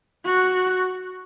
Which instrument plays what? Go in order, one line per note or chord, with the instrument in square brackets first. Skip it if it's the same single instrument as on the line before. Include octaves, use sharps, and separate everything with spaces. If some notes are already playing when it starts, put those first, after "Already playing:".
[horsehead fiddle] F#4